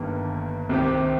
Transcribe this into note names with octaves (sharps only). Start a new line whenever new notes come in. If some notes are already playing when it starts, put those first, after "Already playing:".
Already playing: G1 G2 D#3 A#3
C2 C3 D#3 C4 G4